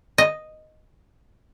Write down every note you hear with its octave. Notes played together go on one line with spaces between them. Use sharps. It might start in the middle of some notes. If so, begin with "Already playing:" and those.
D#5